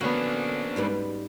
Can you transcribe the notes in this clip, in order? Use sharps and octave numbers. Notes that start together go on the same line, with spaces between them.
D3 A#3 B3 C#4 D4 F#4
G#2 G3 B4